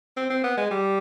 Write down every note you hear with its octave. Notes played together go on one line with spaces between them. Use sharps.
C4
C4
B3
G#3
G3